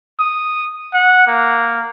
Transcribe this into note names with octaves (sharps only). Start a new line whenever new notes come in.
D#6
F#5
A#3